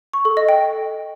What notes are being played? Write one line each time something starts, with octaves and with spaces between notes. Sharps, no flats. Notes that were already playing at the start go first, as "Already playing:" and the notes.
C#6
A4
D#5
G5